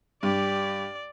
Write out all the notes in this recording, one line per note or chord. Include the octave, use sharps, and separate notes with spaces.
G2 G4 D5